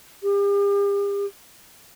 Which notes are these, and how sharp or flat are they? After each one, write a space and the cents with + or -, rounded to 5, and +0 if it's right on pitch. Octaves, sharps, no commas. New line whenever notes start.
G4 +45